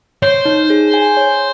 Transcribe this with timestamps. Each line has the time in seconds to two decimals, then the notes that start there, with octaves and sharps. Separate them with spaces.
0.22 C5 C#5
0.45 D#4
0.70 G#4
0.94 G#5
1.17 C#5